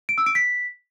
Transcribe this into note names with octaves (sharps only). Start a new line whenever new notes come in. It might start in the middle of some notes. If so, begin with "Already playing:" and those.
D7
E6
D7
B6